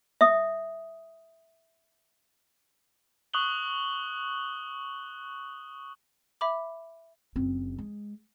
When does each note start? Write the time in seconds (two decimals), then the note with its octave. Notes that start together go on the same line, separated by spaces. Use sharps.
0.21 E5 D#6
3.34 C#6 D#6 F#6 F#7 G7
6.41 E5 B5 D6
7.36 F#1 C4
7.78 G#3